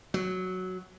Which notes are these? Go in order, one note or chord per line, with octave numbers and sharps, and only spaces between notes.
F#3